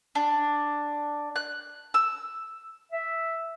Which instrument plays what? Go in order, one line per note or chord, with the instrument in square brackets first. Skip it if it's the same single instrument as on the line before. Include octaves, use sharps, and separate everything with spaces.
[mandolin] D4
F#6
E6
[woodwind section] E5